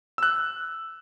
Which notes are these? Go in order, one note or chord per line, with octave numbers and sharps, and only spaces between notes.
E6 F#6